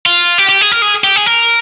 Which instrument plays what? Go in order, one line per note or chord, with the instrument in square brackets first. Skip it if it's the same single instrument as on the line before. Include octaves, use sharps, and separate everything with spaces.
[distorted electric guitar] F4
G4
G4
G#4
A#4
G#4
G4
G#4
A#4